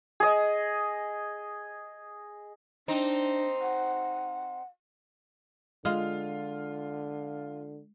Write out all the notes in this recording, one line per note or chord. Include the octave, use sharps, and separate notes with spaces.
G#4 D#5
C4 D4 D#4
F#5
D3 G#3 F4 F6